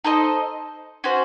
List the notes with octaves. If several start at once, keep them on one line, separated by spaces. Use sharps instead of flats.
D#4 A4 C5 D#5
C#4 F#4 C5